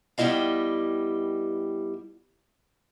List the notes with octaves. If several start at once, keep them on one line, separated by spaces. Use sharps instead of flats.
G2 G3 B3 E4 D#5 F5